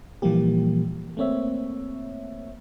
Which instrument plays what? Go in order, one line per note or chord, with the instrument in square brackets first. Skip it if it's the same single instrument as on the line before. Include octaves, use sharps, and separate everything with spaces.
[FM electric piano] A#2 E3 F3 G3 A#3 G4
A3 A#3 C4 C#5 E5